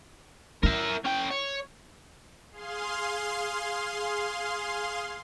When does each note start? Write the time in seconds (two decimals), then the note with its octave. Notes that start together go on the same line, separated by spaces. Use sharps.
0.63 E4 A#4 E5
1.05 C#4 G5
1.31 C#5
2.51 G#4 F5 C6